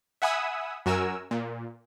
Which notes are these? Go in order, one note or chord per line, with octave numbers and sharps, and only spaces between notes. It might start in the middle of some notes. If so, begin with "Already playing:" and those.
E5 F#5 G#5 B5 D#6 E6
F#2 F#4 A#4 G#5 E6
A#2